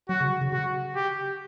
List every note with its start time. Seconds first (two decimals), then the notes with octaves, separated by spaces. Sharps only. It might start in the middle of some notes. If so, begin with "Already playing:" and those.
0.09 F#3 F#4
0.21 C#3
0.41 C#3
0.52 C#3 F#4
0.95 G4